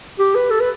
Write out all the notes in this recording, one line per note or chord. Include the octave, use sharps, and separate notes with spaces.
G4
B4
A4
B4